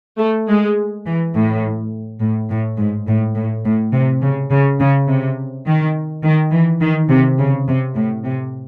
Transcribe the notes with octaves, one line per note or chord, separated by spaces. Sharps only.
A3
G#3
E3
A2
A2
A2
G#2
A2
A2
A2
C3
C#3
C#3
C#3
C3
D#3
D#3
E3
D#3
C3
C#3
C3
A2
C3